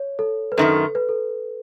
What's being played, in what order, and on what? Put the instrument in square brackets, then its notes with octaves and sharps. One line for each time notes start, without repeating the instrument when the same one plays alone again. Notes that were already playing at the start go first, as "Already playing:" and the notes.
Already playing: [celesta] C#5
A4
B4
[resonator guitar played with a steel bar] F#2 D#3 A3 [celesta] A4
[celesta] B4
A4